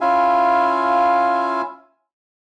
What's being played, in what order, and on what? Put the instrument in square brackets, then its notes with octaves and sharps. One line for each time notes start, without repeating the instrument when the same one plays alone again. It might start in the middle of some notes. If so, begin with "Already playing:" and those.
[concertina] C#4 E4 F4 E5 F5 G#5